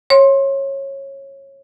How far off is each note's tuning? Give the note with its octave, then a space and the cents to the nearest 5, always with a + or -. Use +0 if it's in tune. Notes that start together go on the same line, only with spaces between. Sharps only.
C#5 -20 C6 +20